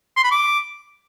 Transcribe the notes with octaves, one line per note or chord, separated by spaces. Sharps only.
C6
B5
D6